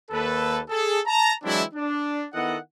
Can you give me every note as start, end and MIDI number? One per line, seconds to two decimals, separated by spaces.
0.11 0.60 39
0.11 0.60 58
0.11 0.60 69
0.11 0.60 71
0.69 0.99 68
0.69 0.99 69
1.06 1.33 81
1.06 1.33 82
1.43 1.62 52
1.43 1.62 54
1.43 1.62 56
1.43 1.62 60
1.43 1.62 62
1.43 1.62 64
1.74 2.26 62
2.33 2.56 51
2.33 2.56 59
2.33 2.56 64
2.33 2.56 69
2.33 2.56 75
2.33 2.56 78